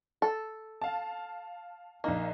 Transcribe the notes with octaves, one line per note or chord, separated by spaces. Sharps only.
A4
F5 A5
A#1 A#3 D#4 D#5